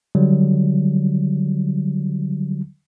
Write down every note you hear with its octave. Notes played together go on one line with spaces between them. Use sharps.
D3 F#3 G3